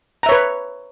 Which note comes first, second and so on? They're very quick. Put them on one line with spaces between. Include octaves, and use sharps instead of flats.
A#5 E5 C#5 B4